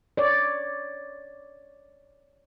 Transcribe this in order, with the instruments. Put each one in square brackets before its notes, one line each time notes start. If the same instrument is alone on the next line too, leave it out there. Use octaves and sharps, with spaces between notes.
[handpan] C#5 D5